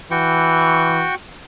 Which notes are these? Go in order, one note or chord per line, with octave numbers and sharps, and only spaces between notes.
E3 F#4 G5 C#6